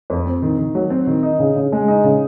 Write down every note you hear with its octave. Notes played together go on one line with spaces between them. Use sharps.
F2
C4
D#3
D#3
F#3
C4
D#3
D#4
C#3
C#3
G#3
D#4
C#3